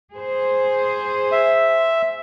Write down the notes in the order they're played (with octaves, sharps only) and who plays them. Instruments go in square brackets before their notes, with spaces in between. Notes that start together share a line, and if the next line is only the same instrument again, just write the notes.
[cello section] G#4 C5
[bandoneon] E5